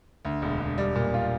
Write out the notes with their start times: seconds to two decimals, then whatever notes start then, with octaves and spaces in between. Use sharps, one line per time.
0.25 D2
0.42 E1
0.60 E1
0.78 G3
0.95 A#2
1.14 F4